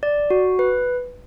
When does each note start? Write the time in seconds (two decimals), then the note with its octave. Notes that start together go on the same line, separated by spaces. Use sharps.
0.03 D5
0.30 F#4
0.59 B4